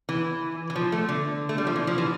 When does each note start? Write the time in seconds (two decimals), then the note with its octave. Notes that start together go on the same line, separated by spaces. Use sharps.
0.09 E3
0.70 E3
0.76 F3
0.92 A3
1.09 D3
1.49 A3
1.58 G3
1.67 F3
1.76 E3
1.87 F3
1.98 E3